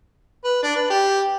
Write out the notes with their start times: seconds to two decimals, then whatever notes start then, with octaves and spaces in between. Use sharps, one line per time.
0.44 B4
0.63 D4
0.75 B4
0.90 G4